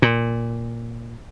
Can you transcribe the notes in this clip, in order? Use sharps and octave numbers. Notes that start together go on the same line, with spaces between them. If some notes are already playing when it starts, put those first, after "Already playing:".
A#2